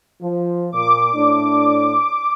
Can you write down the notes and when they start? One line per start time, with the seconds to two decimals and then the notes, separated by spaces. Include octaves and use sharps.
0.21 F3
0.72 A#2 D6
1.13 A2 D4